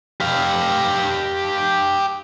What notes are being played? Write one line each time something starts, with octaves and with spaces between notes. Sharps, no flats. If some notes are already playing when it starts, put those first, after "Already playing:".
G4 F5